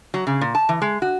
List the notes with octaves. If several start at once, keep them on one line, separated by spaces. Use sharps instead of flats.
F#3
C#3
A#2
A5
E3
G#3
F#4